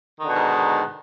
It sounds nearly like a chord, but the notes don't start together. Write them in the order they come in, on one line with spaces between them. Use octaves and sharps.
D#3 D3 B2 G#2